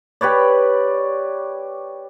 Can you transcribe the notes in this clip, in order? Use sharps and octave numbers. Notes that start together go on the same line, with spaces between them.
G4 B4 C#5 D5